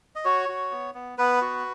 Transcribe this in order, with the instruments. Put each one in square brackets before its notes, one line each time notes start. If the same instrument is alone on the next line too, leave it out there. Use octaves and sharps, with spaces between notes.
[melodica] D#5
F#4 C#5
F#4
B3
B3
B3 B4
F#4